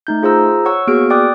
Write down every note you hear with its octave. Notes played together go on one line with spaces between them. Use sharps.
A3 D#4 G6
F4 G#4 C5 A#5 E6
C#5 F#5 C#6 E6
A#3 B3 F#4 G#4 F6 D7
D5 G5 D6 D#6 F#6